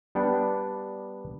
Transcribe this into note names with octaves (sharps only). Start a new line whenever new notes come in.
G3 B3 D4 F#5 G5